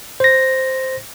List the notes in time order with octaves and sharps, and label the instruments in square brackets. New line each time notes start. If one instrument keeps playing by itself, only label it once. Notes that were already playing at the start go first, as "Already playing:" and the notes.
[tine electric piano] C5 A#6